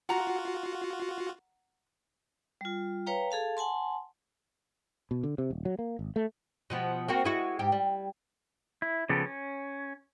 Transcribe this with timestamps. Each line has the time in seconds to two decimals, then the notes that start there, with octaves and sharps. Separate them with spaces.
0.09 F4 F#4 F#5 A#5
2.61 G3 F4
3.06 B4 C#5 F5 G5 A#5
3.31 G#4 A4 F5 A5
3.57 F#5 G#5 A5 C6
5.11 B2
5.23 D3
5.38 C3
5.50 D#1
5.65 F#3
5.79 A#3
5.99 G#1
6.16 A3
6.70 B2 F3 B3
7.08 A#3 C4 F#4
7.24 G#3 E4 F#4
7.59 G#2 G4
7.72 G3
8.82 E4
9.09 C#3 F3 B3 G4 A4
9.26 C#4